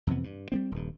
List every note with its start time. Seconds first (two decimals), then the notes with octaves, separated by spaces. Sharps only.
0.07 F2 C3 E3 B3
0.24 G2
0.52 G3 B3 C4
0.72 D#1 G2